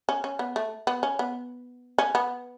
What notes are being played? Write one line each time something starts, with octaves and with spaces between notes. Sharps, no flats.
C#4
C#4
B3
A3
B3
C#4
B3
C#4
B3